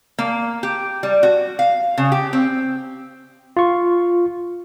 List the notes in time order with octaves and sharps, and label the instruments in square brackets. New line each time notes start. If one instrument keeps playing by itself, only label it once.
[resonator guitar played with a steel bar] A#3
G4
G3
F#4
F5
C#3
G4
C4
[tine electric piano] F4 C#6